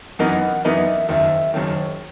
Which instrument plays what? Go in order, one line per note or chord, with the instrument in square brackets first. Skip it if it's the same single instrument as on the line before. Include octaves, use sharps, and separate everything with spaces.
[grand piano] F#2 E3 B3 D#4 A#4 [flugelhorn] F#5
[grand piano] F#2 E3 B3 D#4 A#4 [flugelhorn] E5
[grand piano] F#1 F#2 D#3 [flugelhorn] E5
[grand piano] F#1 F#2 D#3 [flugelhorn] C#5